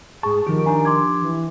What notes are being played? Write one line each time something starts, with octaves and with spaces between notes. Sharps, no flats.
G#2 G#4 A5 C#6
D#3 F3 G4
F3 D4 G4 G#5 A#5
C6 D6 G#6
E3